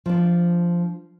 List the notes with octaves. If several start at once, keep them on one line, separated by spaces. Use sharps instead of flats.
F3 D4